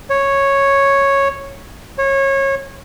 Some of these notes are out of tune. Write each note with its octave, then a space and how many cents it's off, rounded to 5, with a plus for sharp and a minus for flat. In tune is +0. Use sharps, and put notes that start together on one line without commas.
C#5 -5
C#5 -25